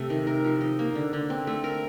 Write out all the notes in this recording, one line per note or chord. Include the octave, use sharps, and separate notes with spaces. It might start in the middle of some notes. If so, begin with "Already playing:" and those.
Already playing: C3 A3
D#3
A#4
F3
D#4
A#3
D3
D3
C4
A3
A#4